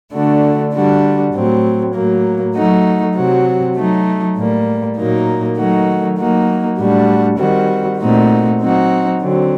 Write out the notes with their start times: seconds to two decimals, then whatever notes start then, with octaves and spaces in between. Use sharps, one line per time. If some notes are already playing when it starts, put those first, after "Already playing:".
0.13 D3 A3 D4 F#4
0.74 D3 G3 D4 F#4
1.33 A2 F#3 C4
1.94 A2 F#3 A#3
2.55 F#3 A3 D#4 F#4
3.15 C3 F#3 C4 F#4
3.76 F#3 A3 D#4
4.36 A2 G3 A#3
4.97 A#2 F#3 A#3 D#4
5.57 D#3 F#3 A3 D#4 F#4
6.18 F#3 A#3 D#4 F#4
6.78 A2 G3 D4 F#4
7.38 D#3 G3 C4 F#4
7.99 A#2 A3 C4 D#4 F#4
8.60 F#3 C4 D#4 F#4
9.20 D3 F#3 C4